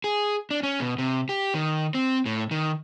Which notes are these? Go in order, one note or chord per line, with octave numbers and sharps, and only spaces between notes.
G#4
D4
C#4
B2
C3
G4
D#3
C4
A2
D#3